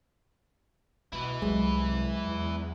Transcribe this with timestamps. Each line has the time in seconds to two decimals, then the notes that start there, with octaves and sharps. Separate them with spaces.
1.13 B2 G#3 E4 B4
1.42 C2 F#3 G#3
2.25 E2